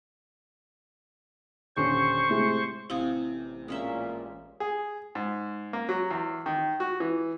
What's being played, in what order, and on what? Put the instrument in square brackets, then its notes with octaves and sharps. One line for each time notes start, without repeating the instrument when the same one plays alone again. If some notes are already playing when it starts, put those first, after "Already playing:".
[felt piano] D#1 D3 C#4 [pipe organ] C5 C#6
[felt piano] A2 C3 G#3
[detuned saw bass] A1 [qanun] C3 G#5 [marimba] E4 F5 D#6
[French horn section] A#2 A#3 [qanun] G#3 C#4 E5
[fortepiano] G#4
G#2
A#3
F#3
E2
D#3
F#4
E3